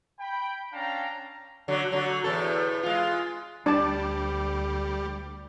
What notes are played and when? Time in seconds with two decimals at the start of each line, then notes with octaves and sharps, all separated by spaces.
0.20 G5 B5
0.73 C#4 D4 F5 G5 A5 A#5
1.68 D3 F#3
1.92 D3 F#3
2.24 E2 A2 A4
2.83 G#3 F4
3.66 D2 G3 D4 D5 A5